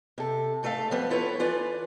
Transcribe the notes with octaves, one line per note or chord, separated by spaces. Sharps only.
C3 A4
G#2 A3 A4 E5 F5
F3 G3 B3 C4
E4 F4 A4 B4 C#5
E3 F4 B4 D5